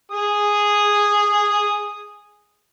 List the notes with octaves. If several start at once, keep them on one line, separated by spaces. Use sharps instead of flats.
G#4 D#6